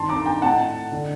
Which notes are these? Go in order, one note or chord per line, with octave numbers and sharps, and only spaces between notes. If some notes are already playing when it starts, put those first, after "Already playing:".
Already playing: G2 D#3 A5 C6
A#5 D6
G5 A#5
A2 F#5 A5
D3